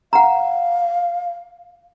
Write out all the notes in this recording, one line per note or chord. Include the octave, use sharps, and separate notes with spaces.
F5 F#5 A#5